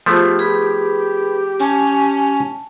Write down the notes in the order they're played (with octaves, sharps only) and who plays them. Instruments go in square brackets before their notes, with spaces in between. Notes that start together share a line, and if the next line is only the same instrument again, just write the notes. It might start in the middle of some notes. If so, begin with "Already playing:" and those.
[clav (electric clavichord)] F3 A3 B3 [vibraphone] F4 G#4 C5 [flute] G4
[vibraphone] G#4 B4 B5
[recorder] C#4 [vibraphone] G#5 A5